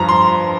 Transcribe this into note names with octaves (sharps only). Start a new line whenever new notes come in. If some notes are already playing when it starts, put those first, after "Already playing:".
Already playing: G2 F3 A#5
C6